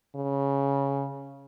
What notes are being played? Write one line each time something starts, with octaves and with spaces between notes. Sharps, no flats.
C#3